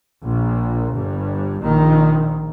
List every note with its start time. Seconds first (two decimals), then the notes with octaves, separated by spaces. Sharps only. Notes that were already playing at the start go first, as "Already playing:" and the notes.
0.24 A#1 A#2
0.93 G1 G2
1.62 A#1 A#2 D#3